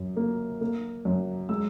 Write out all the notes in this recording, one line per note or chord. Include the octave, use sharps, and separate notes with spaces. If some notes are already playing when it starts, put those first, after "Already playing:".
Already playing: F#2
A#3
A#3
F#2
G#3 E6